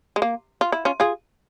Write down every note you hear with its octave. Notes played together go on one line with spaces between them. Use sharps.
G#3
A#3
F4
E4
C#4 F4
F4 G#4